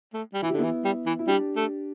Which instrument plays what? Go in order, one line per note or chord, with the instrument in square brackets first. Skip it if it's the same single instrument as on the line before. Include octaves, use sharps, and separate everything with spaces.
[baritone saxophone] A3
G3
[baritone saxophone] E3 [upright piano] E4
[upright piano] G4
[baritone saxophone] D3 [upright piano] B3 E4
[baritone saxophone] E3
G3
E3
[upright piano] E4
[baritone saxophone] G3 [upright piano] D4 G4
[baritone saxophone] A3